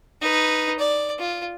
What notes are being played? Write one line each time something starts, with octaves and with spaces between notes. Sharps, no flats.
D#4 B4
D5
F4